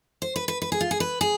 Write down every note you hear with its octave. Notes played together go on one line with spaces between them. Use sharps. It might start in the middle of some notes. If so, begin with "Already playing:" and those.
C5
B4
B4
B4
G#4
F4
G#4
B4
G#4